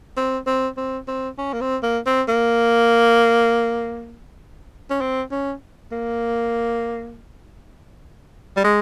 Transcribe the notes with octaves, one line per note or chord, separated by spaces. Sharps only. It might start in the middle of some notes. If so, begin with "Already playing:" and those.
C4
C4
C4
C4
C#4
A#3
C4
A#3
C4
A#3
C#4
C4
C#4
A#3
G3
G#3